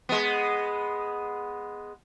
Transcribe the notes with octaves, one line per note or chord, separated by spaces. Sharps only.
G#3 B3